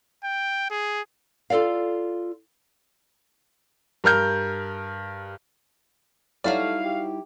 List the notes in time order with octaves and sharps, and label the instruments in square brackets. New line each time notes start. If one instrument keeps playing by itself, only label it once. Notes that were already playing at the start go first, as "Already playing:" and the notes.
[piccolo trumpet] G5
G#4
[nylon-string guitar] F4 A4 A#4 D5 F5
[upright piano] G2 A#4 F6 G6
[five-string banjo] F#3 F#4 D5 [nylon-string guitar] G3 D#4 E4 [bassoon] A3 [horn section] F5
[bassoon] G4